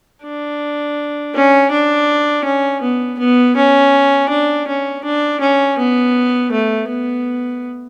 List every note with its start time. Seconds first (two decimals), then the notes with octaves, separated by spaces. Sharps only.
0.24 D4
1.34 C#4
1.71 D4
2.44 C#4
2.82 B3
3.19 B3
3.56 C#4
4.29 D4
4.68 C#4
5.04 D4
5.41 C#4
5.78 B3
6.52 A3
6.89 B3